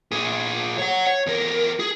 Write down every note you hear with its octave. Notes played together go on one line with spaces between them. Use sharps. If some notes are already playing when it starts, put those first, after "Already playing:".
A#2 G#4
C#5 F#5
C#5
E2 A#4
G#4